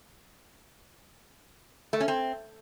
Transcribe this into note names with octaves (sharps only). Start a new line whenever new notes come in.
A3
C#4
C4